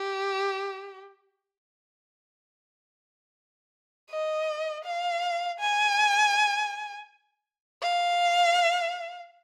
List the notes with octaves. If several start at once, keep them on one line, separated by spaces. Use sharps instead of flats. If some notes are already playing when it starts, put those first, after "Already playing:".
Already playing: G4
D#5
F5
G#5
F5